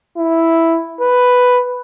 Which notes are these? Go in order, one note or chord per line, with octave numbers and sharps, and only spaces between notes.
E4
B4